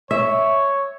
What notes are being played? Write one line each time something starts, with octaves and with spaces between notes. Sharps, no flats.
C#5 E5